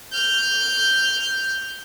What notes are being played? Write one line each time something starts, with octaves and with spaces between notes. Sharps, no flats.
F6 G6